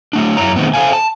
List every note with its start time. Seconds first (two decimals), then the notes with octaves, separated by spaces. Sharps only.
0.13 F#3 A3 D4
0.37 F#2 E4 C#5 A#5
0.56 B2 D#3 A3 B3 C4
0.74 A4 B4 C5 F5 G#5
0.93 A5